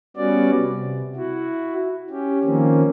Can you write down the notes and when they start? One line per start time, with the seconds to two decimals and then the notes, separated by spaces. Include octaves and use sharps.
0.17 G3 B3 C#4 F#4 D5
0.55 C3
1.16 E4 F#4
2.10 C#4 G4
2.44 D#3 F3 A#3 C4 C#4